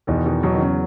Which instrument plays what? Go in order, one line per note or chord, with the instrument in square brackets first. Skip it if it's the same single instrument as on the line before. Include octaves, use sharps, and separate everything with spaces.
[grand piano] E2 [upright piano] B2 D#3
[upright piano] B2 D#3
[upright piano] B2 [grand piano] F#3
[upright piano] D#3
C#3